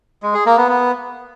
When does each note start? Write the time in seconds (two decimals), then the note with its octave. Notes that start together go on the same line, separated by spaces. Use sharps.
0.23 G#3
0.34 G#4
0.46 A#3
0.57 B3
0.69 B3